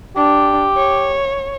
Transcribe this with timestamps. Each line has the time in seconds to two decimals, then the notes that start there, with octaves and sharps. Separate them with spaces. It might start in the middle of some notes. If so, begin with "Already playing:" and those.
0.17 D4 G4
0.77 C#5